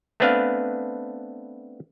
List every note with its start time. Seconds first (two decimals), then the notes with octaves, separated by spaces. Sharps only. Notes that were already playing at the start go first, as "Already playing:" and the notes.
0.20 A3 B3 C4 D4 B4 F5